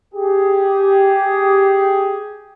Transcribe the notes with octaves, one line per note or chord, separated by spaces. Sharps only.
G4 G#4